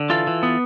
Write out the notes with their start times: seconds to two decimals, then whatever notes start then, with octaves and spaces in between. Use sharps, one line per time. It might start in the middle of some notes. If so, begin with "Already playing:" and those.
Already playing: D3
0.10 E3 F4 A4
0.27 E3
0.43 B3